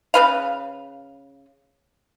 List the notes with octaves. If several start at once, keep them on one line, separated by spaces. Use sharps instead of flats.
C#3 B4 F5